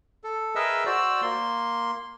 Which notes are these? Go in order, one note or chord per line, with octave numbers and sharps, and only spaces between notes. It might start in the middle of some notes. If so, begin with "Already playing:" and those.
A4
G#4 A#4 B4 D#5 E5 E6
F#4 C5 D5 E6
A#3 C6